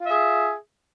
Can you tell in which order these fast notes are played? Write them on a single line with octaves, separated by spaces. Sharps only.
F4 E5 G#4